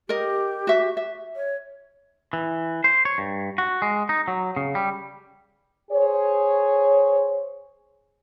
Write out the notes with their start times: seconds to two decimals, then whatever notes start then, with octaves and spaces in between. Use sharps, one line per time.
0.09 G4 A#4 D#5
0.67 F#4 E5
0.97 E5
1.36 C#5
2.33 E3
2.84 C5
3.05 C#5
3.18 G2
3.58 F#4
3.82 G#3
4.09 D#4
4.28 F#3
4.56 C#3
4.75 G3
5.91 G#4 C5 C#5